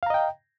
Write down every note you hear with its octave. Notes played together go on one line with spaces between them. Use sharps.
D#5 F5 G5 A#5